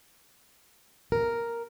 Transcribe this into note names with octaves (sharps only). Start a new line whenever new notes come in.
A#4